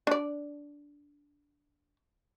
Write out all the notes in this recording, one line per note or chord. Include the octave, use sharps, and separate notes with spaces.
D4 D5